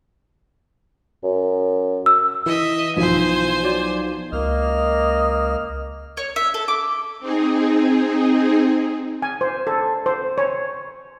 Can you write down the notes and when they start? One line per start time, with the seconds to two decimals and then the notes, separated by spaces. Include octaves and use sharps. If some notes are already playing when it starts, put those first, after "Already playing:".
1.23 F#2
2.06 E6
2.46 E3 D#5 E5
2.96 B1 F3 C5 G#5
3.63 F#3 D5
4.32 C#2 A#3 D#5 F6
6.17 C#5
6.36 E5
6.54 A4
6.68 D6
7.20 C4 D#4 G#4
9.22 G#5
9.41 C5
9.67 A4
10.06 C5
10.38 C#5